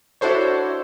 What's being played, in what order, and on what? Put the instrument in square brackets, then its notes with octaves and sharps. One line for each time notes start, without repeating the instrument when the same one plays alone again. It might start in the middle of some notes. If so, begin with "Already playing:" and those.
[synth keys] D4 E4 F#4 A4 C5 C#5